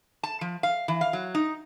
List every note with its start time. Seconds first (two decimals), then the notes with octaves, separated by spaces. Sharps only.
0.23 A5
0.41 F3
0.63 F5
0.88 E3
1.01 F5
1.13 F#3
1.35 D#4